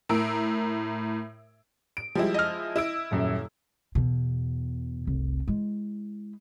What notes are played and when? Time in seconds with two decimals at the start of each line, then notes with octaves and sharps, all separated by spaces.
0.09 A2 A#4 E6 D7
1.97 D7
2.15 F3 G3 G#3 E4
2.34 D#5 F6
2.76 E4 E6 D7
3.11 D#1 F#2
3.95 E2 B2
5.07 F1 C2
5.48 G#3 E4